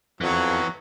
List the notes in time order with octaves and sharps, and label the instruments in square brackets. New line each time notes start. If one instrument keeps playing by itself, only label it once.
[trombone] F2 [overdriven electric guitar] E3 B3 [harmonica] F#3